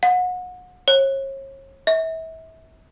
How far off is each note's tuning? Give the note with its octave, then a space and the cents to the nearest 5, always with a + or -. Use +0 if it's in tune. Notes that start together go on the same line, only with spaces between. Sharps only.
F#5 -30
C#5 -40
E5 -35